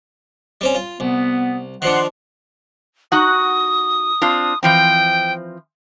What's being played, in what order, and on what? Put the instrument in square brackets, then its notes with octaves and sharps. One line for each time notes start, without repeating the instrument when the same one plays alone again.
[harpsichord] G3 C4 C#4
F4
[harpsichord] C2 [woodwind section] B3
[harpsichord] D#3 F3 D4 [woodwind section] F#5 C6
[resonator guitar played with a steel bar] D#4 F#4 F#5 [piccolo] D#6
[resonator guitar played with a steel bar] C4 D4 F4
[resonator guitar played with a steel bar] E3 F3 C4 [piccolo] G5